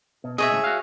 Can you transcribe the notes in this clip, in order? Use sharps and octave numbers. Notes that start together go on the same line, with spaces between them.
B2
B2 G#4 C#5 D#5 E5
C#2 A2
F#4 F5